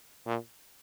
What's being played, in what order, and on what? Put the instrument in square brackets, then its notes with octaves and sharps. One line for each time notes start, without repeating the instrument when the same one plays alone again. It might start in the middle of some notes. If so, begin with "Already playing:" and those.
[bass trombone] A#2